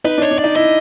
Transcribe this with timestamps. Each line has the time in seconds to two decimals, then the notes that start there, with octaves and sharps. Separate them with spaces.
0.05 D#4 B4
0.18 D4
0.22 C#5
0.31 D4
0.39 D5
0.44 D#4
0.56 E4 D#5